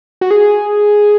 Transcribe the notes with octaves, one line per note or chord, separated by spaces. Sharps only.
F#4
G#4